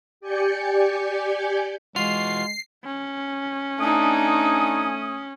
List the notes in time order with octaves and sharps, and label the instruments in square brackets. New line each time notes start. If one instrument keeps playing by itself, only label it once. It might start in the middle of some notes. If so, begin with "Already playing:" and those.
[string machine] G4 D5 G#5 G6 C#7
[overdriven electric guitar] E3 F#4 [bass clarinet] G#3 [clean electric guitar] F4 [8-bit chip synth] C7
[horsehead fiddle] C#4
[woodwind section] A3 G#5 D#6 [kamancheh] D4 D#4